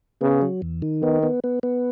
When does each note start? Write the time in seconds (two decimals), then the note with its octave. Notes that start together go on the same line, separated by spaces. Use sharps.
0.21 C#3 B3
0.42 F#3
0.62 E2
0.82 D#3
1.03 D#3 B3
1.23 B3
1.44 B3
1.63 B3